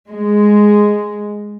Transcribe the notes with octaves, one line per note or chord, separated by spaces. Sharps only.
G#3